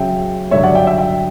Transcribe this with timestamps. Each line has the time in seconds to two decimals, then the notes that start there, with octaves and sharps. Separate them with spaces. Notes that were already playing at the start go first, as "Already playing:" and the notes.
Already playing: C#3 F#3 C#4 E5 G5
0.51 G2 D3 F#3 C#5 E5
0.63 D5 F#5
0.75 E5 G5
0.87 E5 G5
0.98 E5 G5